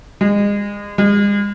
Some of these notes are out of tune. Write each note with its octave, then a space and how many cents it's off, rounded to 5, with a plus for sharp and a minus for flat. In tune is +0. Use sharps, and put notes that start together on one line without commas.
G#3 -30
G#3 -40